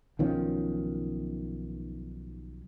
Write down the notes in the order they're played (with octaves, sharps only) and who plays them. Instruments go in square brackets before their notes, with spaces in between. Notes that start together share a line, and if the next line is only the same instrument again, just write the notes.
[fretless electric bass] B1 D#3 F3 C#4